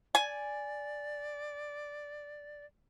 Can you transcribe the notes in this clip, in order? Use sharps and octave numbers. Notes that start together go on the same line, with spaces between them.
D5 G#5